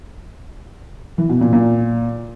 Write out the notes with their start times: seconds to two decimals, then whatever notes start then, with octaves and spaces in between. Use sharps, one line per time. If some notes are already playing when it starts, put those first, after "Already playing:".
1.18 E3
1.30 B2
1.41 A#2
1.53 A#2